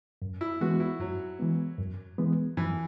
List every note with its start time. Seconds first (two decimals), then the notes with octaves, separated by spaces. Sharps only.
0.22 F#2
0.41 E4
0.61 E3 G#3 B3 F#4
0.80 E4
1.00 F#2 F#3
1.39 E3 G#3 B3
1.79 F#2
2.18 E3 G#3 B3
2.57 F#2 E3